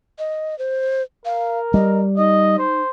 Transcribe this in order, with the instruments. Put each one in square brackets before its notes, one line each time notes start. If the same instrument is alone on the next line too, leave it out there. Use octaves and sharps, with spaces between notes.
[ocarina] D#5
C5
[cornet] A#4 [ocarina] F5
[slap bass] G3 [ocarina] D#5
[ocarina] D#4 [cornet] D#5
[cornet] C5